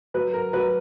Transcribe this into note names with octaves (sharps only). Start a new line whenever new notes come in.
F#3 B4
A#4
F#3 B4